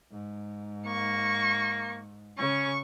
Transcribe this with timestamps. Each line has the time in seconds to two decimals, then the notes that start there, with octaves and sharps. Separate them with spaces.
0.12 G#2
0.86 A#3 C#6
2.38 C#3 C#4 C#6